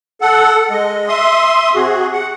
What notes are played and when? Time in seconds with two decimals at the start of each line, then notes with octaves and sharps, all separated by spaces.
0.21 A4 F#5
0.70 G#3 D#5
1.08 E5 C6 D#6
1.74 C3 F#4 G#4
2.13 F#5